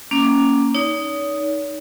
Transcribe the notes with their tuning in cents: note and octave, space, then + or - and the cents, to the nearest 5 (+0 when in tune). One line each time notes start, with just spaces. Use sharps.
A#3 +0 C#4 +0 D6 +0
D#4 +0 C#5 +45